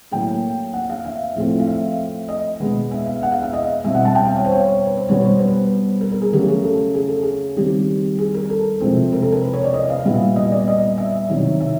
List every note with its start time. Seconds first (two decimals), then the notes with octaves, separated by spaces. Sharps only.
0.12 A2 F#3 A#3 G5
0.73 F#5
0.90 F5
1.05 E5
1.35 A2 F3 A3 C4
1.59 F5
1.67 E5
2.29 D#5
2.60 B2 G#3 B3
2.91 E5
3.06 F5
3.23 F#5
3.32 F5
3.43 E5
3.53 D#5
3.84 B2 G3 C4 E5
3.95 F#5
4.05 A5
4.15 G5
4.25 F5
4.36 C#5
4.45 C5
4.52 C#5
4.85 B4
4.97 C5
5.09 B2 G3 B3 C#5
5.24 C5
5.39 B4
6.01 A#4
6.12 A#4
6.22 G#4
6.33 C#3 F#3 A3 G4
6.48 G#4
6.64 A4
6.94 G#4
7.09 A4
7.22 G#4
7.56 D#3 G3 C4 G4
8.18 G#4
8.34 A#4
8.50 A4
8.81 C3 F3 G#3 C4
9.12 A#4
9.22 A4
9.32 A#4
9.44 B4
9.53 C#5
9.64 D5
9.74 D#5
9.90 F5
10.05 A#2 G3 B3 E5
10.36 D#5
10.52 D5
10.68 D#5
10.98 E5
11.29 C3 D#3 F#3
11.60 E5